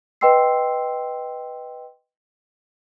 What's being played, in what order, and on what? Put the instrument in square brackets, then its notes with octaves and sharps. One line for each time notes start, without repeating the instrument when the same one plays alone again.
[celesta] B4 D#5 G5 C6 E6 C7